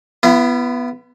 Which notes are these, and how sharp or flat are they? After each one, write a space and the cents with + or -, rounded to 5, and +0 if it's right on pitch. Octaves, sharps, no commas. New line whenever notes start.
B3 +0 E4 +45